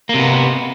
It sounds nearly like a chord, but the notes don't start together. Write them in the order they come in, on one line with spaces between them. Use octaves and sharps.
A#3 C3 B3